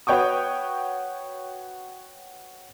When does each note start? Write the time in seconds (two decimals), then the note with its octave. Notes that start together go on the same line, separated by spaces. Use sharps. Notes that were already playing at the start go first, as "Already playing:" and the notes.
0.07 F#4 B4 C#5 G5 C#6 D#6